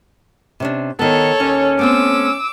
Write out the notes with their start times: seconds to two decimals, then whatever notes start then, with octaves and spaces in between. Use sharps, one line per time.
0.60 C3 C#4 D4
0.99 D#3 B3 A4 C#5
1.40 D#2 C#4
1.79 A3 B3 C4 D6 E6